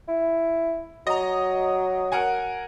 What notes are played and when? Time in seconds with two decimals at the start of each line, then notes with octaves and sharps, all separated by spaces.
0.08 E4
1.07 F#3 D#5 A#5
2.12 A#4 F#5 G#5